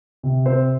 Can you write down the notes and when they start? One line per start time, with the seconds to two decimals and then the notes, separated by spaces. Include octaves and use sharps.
0.23 C3
0.46 C4 C5